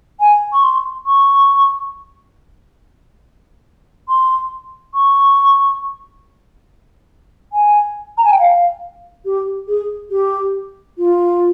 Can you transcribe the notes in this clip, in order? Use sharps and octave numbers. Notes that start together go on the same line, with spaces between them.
G#5
C#6
C6
C#6
C6
C#6
G#5
A#5
G#5
G5
F5
G4
G#4
G4
F4